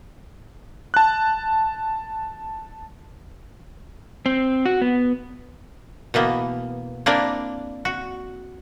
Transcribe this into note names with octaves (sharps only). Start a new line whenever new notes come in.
A5 F#6
C4
F#4
B3
B2 E3 A#3 B3
A#3 C4 D4 E4 A#4 D5
F#4